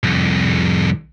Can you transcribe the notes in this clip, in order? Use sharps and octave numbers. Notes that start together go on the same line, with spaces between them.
C2 F2